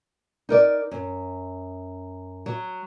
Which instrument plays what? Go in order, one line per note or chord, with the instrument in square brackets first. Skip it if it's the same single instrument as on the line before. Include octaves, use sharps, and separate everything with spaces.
[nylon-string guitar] D#4 A#4 D5
F#2
F#3